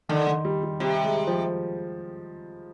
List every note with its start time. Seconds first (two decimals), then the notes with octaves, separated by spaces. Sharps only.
0.09 D3 D#3
0.27 D#3
0.45 G3
0.63 G3
0.80 C3 G3
1.04 G#3
1.27 F3